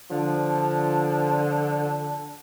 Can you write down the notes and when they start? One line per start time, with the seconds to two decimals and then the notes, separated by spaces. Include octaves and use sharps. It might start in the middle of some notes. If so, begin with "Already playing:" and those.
0.11 D3 F3 A5